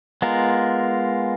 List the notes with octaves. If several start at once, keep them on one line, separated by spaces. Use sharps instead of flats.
G#3 B3 F4 A#4